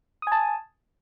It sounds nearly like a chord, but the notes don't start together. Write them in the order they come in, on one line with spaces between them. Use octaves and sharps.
D#6 G#5 A5